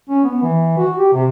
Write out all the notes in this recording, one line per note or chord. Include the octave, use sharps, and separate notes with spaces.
C#4
B3
E3
F#4
G4
C3